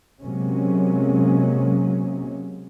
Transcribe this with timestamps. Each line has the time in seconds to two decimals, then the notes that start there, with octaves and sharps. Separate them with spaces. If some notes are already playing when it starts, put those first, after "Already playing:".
0.23 C3 F#3 G#3 A#3 C#4